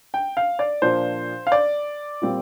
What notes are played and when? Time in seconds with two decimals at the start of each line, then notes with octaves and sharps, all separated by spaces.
0.14 G5
0.37 F5
0.59 D5
0.82 A#2 F3 D4 F4 C5
1.47 F5
1.52 D5
2.22 A#2 G3 C4 F4